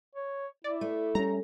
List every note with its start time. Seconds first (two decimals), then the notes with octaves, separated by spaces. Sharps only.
0.15 C#5
0.64 E4 D5
0.81 A3
1.15 G3 C#4 A#5